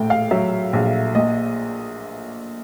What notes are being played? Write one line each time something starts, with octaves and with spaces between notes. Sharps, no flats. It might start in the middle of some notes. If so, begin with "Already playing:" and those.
Already playing: A#1 A2 G5
F5
F#3 E5
A#1
A#2 D#5